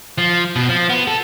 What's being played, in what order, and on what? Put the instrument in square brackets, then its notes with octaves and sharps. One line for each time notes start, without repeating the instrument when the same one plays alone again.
[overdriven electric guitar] F3
B2
F3
B3
A4